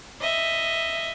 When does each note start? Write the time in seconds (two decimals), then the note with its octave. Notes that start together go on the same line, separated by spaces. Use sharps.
0.21 D#5 E5